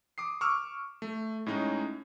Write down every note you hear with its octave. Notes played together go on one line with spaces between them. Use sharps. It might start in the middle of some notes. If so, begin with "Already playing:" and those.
D6 D#6 C7
C#6 D6 E6 F6
A3
A2 G#3 C#4 D#4